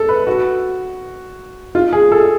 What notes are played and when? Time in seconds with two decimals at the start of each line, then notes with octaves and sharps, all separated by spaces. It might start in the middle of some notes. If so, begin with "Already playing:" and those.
Already playing: A4
0.09 B4
0.27 F#4
1.75 F4
1.93 G#4
2.12 A4